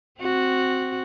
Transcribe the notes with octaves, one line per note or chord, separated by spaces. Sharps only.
C4 F#4